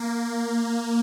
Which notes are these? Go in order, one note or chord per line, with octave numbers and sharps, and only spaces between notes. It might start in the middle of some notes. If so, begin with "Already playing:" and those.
Already playing: A#3